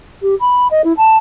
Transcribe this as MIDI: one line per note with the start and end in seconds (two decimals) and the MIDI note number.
0.22 0.35 67
0.40 0.68 83
0.71 0.82 75
0.84 0.93 64
0.97 1.17 81